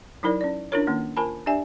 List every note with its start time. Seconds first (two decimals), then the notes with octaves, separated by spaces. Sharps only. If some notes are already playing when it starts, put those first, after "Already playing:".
0.23 F#3 D#4 E4 A#4 C5 D5
0.41 C#4 D5
0.72 C#4 D4 E4 F4 A#4 C#5
0.87 D#3 A#3 C#4
1.17 F4 A#4 C5 G#5 A5 B5
1.46 D4 G4 D5 E5 G#5